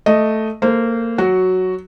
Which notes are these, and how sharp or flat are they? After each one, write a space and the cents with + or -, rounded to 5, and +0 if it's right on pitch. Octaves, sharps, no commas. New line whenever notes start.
A3 +0 D#5 +0
A#3 -20 A4 +0 C5 -15
F#3 +0 F#4 +5